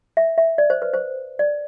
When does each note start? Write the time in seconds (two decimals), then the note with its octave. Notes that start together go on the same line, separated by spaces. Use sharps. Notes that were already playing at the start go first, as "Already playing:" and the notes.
0.17 E5
0.38 E5
0.58 D5
0.70 C5
0.82 B4
0.94 C5
1.39 D5